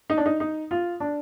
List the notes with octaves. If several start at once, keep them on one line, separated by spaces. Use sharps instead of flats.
D#4
D4
D#4
D#4
F4
D4